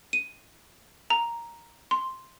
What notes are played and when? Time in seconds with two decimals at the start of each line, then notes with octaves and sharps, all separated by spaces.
0.13 D#7
1.10 A#5
1.91 C6